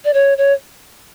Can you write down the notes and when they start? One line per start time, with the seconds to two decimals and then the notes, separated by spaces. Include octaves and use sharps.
0.05 D5
0.14 C#5
0.38 C#5